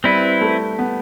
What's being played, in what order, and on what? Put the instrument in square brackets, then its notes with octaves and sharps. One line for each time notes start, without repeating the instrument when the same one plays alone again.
[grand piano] G3 [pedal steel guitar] C4 E4 B4
[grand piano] A3
B3